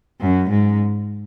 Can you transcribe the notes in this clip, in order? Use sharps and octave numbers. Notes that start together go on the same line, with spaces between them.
F#2
G#2